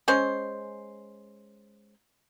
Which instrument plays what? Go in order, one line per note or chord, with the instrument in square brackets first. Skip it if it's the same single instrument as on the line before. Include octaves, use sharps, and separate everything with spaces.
[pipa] G#3 C#4 C5